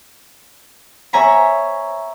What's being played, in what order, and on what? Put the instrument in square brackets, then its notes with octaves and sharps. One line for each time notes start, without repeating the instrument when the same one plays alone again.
[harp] C#5 E5 G#5 A#5 B5